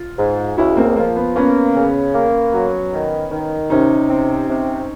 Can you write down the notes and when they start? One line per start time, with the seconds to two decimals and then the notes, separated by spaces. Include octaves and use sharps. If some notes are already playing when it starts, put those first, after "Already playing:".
Already playing: F4
0.18 G#2
0.57 C#2 E4 F#4
0.77 A#3 C4
0.96 F3 A#3
1.16 B3
1.36 A#3 B3 C#4
1.76 C#3
2.14 A#3
2.53 F#3
2.93 D#3
3.31 D#3
3.70 C3 C#4 D#4
4.10 C4
4.49 C3